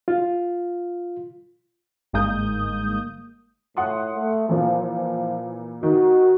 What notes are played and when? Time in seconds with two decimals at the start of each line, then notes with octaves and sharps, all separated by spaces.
0.08 F4
2.13 G1 G#2 G#3 A#3 D#6 G6
3.77 A2 F#5 C6 D#6
4.14 A3
4.49 A#2 E3 F3
4.80 F3
5.83 D#3 F#4